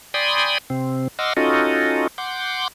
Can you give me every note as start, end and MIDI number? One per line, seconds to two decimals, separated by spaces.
0.14 0.58 74
0.14 0.58 79
0.14 0.58 80
0.14 0.58 83
0.14 0.58 84
0.14 0.58 87
0.70 1.08 48
0.70 1.08 60
1.19 1.33 75
1.19 1.33 78
1.19 1.33 84
1.19 1.33 86
1.19 1.33 88
1.19 1.33 89
1.37 2.07 61
1.37 2.07 63
1.37 2.07 65
1.37 2.07 66
1.37 2.07 69
1.37 2.07 75
2.18 2.68 78
2.18 2.68 84
2.18 2.68 86
2.18 2.68 91